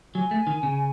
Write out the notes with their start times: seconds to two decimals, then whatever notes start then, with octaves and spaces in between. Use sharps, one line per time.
0.15 F#3 G#5
0.31 A3
0.47 D#3
0.63 C#3